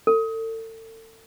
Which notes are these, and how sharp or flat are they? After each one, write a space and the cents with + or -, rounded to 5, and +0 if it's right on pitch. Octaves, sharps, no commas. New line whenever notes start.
A4 +35